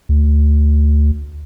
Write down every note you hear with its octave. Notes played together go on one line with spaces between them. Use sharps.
D2